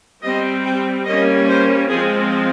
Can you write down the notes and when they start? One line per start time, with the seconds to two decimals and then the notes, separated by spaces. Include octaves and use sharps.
0.22 G3 C4 D#5
0.64 G5
1.05 G3 A#3 C#4 D#5
1.47 C5
1.89 F3 G#3 C4 G#4